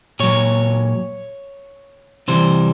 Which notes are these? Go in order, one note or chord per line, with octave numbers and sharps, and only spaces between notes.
A#2 F#3 C#5
C3 E3 G3 C5